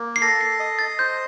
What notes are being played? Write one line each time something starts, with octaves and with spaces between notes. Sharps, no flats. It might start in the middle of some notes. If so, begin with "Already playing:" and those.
Already playing: A#3
C7
A4 A#6
C7
D#5
A6
C5 G6